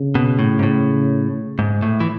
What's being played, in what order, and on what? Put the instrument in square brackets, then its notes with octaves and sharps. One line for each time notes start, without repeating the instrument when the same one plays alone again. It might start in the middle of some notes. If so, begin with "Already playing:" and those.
Already playing: [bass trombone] C#3
[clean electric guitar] B2
A2
G#2
A2
G#2
A2
E3